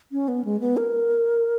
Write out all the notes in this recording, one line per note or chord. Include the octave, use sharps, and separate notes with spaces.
C#4
B3
G#3
B3
A#4